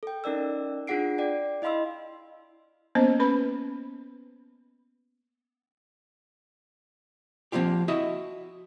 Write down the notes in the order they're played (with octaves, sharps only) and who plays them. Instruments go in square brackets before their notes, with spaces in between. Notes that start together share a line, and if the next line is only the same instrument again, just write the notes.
[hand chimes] A4 G5
C#4 D#4 A#4 D5 E6
D4 F4 G#4 F#5 C7 D7
D5 G5
E4 D#5 F5 B5 C6 E6
[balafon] A#3 B3 C#4 C5 D#5
C#4 B4 B5
[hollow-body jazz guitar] F3 A#3 C4 F4 G4
E4 F#4 D#5 E5